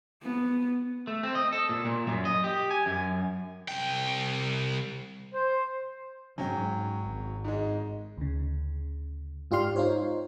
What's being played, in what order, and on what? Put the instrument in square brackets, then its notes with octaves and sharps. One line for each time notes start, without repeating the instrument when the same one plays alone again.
[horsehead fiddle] B3
[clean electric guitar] A3
C4
D#5
A4
A#2
A#2
F#2
D#5
G4
G#5
F#2
[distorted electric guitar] C2 G5
[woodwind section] C5
[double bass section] G#2 [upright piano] F#3 C#4 G5
[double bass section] G#1
[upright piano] G#2 G#3
[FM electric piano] D2 C#3
G#2 F4 G4 D5 C6 F6
D#4 F4 C5 C#5